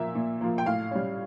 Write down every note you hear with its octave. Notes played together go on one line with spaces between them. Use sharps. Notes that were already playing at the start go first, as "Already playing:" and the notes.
Already playing: A#2 F3 A#3 E5
A#2
F3 A#3
G5
A2 F5
G3 C#4